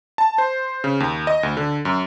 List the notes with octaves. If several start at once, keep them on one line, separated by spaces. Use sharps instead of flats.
A5
C5
C#3
D#2
D#5
D2
D3
F#2